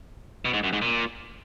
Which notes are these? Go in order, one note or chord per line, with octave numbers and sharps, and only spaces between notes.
B2
G#2
F#2
G#2
A#2